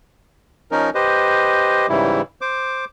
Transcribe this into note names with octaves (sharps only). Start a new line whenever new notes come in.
F3 C#4 D#4 A#4
G4 B4 C5 D#5
G#2 C#3 E3 G3 E4
C5 D6